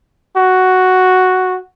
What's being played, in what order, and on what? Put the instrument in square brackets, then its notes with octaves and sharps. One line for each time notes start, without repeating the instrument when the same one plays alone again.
[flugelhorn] F#4